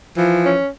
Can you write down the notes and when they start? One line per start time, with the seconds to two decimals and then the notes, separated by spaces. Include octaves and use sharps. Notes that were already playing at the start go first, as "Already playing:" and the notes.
0.17 E3 F3
0.44 C#4